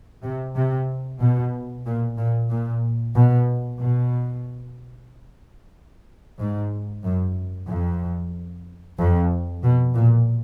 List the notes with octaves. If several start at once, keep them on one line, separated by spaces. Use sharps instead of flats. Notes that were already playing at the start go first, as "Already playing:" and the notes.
C3
C3
B2
A#2
A#2
A#2
B2
B2
G#2
F#2
F2
F2
B2
A#2